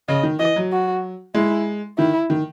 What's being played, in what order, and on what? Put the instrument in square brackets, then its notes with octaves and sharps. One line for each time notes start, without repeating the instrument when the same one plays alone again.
[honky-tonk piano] C#3 [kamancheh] D#5
[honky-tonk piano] D#3
[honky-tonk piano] E3 [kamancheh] D#5
[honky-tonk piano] F#3
[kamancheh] F#4
[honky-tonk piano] G#3 [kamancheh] E4
[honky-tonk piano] D#3 [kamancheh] E4
[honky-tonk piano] D#3